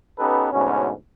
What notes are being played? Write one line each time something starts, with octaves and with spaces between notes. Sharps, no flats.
B3 C#4 D#4 G4 A4 B4
D2 G#2 B2 C#4